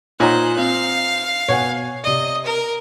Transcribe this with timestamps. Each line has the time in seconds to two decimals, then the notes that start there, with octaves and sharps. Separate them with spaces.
0.20 A#2 D#4 C5 C#5 F#5 G#5 A#5 F#6
0.57 C4 F5
1.48 B2 C#5 F#5 G#5
2.04 C3 D5 D#5
2.45 A#4